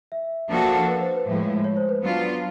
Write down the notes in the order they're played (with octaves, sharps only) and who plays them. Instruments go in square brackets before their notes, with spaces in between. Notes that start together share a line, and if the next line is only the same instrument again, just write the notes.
[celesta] E5
[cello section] F3 A#3 D4 F#4 A4
[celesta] B4
C5
B4
[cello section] A2 F3 G#3
[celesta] C#5
C5
B4
[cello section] F#3 B3 D4 F4